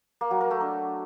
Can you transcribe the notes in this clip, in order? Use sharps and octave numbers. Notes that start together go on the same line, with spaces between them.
A#3
F#3
A#4
A3
D4